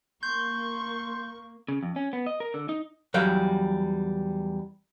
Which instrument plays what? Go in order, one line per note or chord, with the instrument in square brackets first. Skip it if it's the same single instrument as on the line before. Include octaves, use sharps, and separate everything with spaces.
[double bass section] A#3 [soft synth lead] C6 [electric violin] C#6 [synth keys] G6
[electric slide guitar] C#3
F2
C#4
B3
D#5
A#4
D3
D#4
[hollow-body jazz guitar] E2 F#3 G3 F5 G5